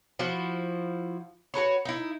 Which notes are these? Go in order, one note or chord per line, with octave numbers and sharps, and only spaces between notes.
F3 E4 F#4
F#4 A#4 B4 C#5
D#4 E4